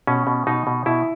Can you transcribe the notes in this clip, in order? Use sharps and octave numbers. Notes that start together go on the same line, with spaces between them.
B2 C#4
B2
B2 D#4
B2
B2 E4